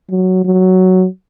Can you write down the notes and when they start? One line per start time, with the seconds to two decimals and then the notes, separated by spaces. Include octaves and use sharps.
0.10 F#3
0.45 F#3